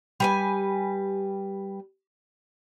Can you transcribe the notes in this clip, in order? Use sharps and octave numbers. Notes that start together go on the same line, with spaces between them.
G3 B4 G#5